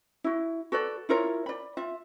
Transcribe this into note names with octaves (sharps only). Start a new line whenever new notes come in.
E4 F#4
F#4 A4 B4 D5
E4 F4 A#4 C#5
D5 B5
F4 E5